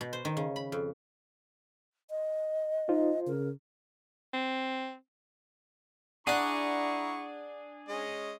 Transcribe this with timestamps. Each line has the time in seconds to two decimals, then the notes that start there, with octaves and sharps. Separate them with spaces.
0.01 B2
0.13 C5
0.25 D#3
0.37 C#3
0.56 B5
0.72 F2
2.10 D#5
2.89 D#4 F4 C5
3.27 C#3 A#4
4.34 C4
6.27 D4 E4 G#4 F#5 A#5 C#6 F#6
7.89 G#3 C#4 D#5